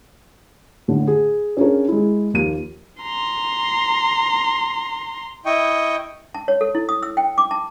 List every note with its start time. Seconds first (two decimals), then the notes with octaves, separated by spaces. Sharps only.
0.88 A2 D3
1.07 G#4
1.57 C#4 D4 F4 G#4 A#4 C#5
1.88 G#3 E4
2.34 D#2 F3 A#3 D#7
3.02 A#5 C6
5.46 E4 D#5 G5 C#6
6.35 A5
6.48 C#5
6.61 A4
6.75 E4
6.89 D#6
7.03 E6
7.17 G5
7.38 D6
7.51 A5